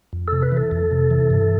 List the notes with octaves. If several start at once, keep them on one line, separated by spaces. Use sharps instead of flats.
F2
C3 A4
B4
E3 A4
F2
C3
E3
G2